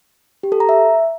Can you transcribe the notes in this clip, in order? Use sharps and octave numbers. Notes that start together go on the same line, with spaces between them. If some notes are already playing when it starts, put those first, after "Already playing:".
G4
A4
A#5
E5